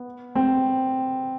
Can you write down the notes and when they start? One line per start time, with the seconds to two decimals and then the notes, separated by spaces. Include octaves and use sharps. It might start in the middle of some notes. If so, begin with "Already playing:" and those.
Already playing: B3
0.35 C4